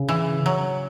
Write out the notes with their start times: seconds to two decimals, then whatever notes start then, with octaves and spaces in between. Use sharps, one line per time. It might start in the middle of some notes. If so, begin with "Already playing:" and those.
Already playing: C#3
0.09 E3
0.46 F#3